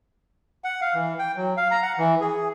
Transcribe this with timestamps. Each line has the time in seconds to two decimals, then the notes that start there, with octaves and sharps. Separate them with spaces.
0.64 F#5
0.81 F5
0.94 E3
1.19 G5
1.36 F#3
1.57 F5
1.71 A#5
1.82 F#5
1.98 E3
2.21 G#4